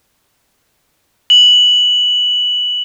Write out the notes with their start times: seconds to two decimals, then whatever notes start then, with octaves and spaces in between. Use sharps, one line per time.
1.30 F#7